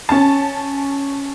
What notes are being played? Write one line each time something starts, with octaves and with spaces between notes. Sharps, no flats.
C#4 A5